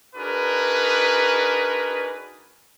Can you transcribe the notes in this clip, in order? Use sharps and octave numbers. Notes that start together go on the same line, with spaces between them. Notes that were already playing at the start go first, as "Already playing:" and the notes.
D4 D#4 F#4 G#4 A#4 B4